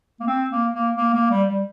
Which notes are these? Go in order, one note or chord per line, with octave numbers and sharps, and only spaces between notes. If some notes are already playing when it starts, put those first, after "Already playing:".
A#3
C4
A#3
A#3
A#3
A#3
G3
G3